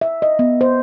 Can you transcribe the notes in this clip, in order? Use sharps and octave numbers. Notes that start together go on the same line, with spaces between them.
E5
D#5
B3
C5